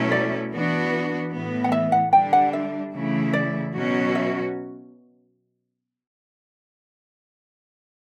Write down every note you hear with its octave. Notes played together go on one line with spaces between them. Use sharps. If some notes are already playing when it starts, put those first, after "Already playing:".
Already playing: B2 F#3 A3 C#4 E4
D5
E3 B3 D4 F#4
A2 E3 B3
F#5
E5
F#5
D3 G3 D4 G5
F#5
E5
C#3 E3 A3 E4
D5
B2 F#3 C#4 F#4
E5